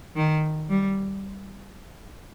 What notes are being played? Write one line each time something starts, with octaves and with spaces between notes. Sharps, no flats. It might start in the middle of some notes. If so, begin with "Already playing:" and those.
D#3
G3